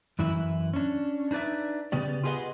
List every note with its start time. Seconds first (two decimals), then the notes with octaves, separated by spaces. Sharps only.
0.19 F#2 E3 E4
0.73 C#4 D4
1.31 D4 D#4 B4 D5 E5
1.92 C#3 B3 G4 D5
2.23 F4 G4 G#4 B4 D#5 F#5